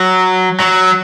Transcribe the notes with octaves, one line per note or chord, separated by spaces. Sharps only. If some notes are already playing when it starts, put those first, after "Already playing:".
Already playing: F#3
F#3